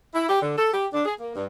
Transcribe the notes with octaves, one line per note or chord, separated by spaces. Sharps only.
E4
G4
D3
A4
G4
D4
G#4
A#3
G2